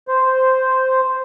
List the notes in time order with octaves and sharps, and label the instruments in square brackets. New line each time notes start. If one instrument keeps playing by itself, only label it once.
[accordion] C5